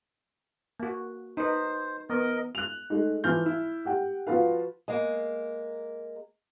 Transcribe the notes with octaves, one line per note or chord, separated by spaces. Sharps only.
A#3 F#4
D#4 B4 C5
B3 A#4 D#5
F#6 F7
G#3 A3 D#4
E3 F3 F6 G6
E4
G4 F#5 G5
F3 F4 F#4 B4 F5
G#3 A#3